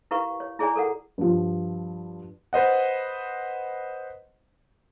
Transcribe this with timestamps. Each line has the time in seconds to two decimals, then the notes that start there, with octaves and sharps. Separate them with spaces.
0.11 E4 G4 A#4 B4 F5 C#6
0.40 C#5
0.59 E4 G#4 C#5 D5 G#5 A#5
0.76 A4 A#4 F#5
1.18 G2 F3
2.53 B4 C5 D#5 F#5